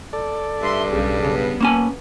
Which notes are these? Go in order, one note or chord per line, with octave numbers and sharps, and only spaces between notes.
A4 D5
G2 E5 C6
B1 C#3 G3
C#3 B3
A#3 C#4 G#5